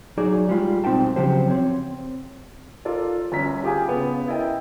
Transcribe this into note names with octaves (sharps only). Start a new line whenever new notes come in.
F#3 D#4 F#4 G#4 D5
G3 G#3 F4
B1 C4 D#4 G5 A5
C#3 F3 F#3 G4 C5
C4 C#5
F4 A4 A#4 D5
G1 C#4 A#5 B6
F4 G4 G#4 F5 G5 G#5
C#3 B3 B5
E4 A#4 D#5 G5